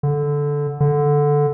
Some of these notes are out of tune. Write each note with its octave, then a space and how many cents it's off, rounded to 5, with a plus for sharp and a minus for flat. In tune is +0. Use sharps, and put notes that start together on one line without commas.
D3 -10
D3 -5